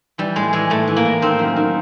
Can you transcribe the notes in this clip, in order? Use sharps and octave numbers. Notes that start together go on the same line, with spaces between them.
E3 G3
A2 G#3
E3 G#3
A2 A3
E3
A#3
A2
D#3 C4
F#2
D#3